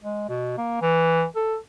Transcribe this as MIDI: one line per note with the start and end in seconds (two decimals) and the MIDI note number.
0.03 0.28 56
0.29 0.55 47
0.58 0.81 58
0.82 1.25 52
1.36 1.57 69